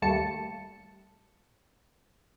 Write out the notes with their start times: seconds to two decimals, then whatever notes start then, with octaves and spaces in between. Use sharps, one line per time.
0.02 D#2 G3 A3 A#3 A5 C#7